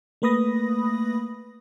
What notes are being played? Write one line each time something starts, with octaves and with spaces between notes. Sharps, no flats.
A3 A#3 B4 B5 D#6 A#6